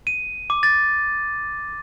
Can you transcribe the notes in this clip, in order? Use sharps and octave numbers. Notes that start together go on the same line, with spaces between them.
D#7
D6
A6